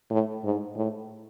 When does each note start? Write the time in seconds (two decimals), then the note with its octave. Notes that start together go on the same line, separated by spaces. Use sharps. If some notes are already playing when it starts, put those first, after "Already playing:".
0.11 A2
0.44 G#2
0.76 A2